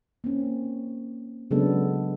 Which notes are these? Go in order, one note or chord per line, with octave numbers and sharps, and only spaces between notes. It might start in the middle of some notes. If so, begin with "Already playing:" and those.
A#3 C4 C#4
C#3 F#3 G#3 B3 D4 A4